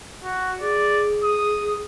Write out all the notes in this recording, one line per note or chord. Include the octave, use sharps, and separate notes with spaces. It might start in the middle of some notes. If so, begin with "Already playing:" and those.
F#4
G#4 D5
D#6